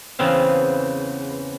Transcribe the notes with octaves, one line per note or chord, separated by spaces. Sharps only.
E2 C#3 B3 C4 F5